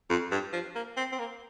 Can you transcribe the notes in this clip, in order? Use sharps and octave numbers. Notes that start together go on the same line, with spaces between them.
F2
G2
F3
A#3
C4
C4
A#3